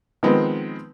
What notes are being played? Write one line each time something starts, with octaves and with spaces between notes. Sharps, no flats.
D#3 F3 G#3 B3 C4